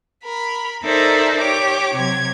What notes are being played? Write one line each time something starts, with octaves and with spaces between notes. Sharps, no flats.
A#4 B5
D#4 A4 A#4 C5 D5 E5
G4 C#5 D6
C3 F#3 G#6